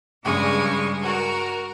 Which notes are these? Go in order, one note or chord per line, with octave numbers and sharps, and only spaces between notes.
G2 C#3 G3 G#3 G#5 C#6
F#4 A#4